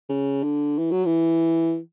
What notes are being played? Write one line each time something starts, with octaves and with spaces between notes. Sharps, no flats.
C#3
D3
E3
F#3
E3